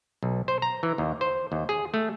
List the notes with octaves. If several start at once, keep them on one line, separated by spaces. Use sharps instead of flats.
B1
C5
A#5
E3
D#2
C5
D#2
G#4
A3